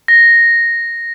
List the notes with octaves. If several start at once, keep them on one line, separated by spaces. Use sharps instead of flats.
A#6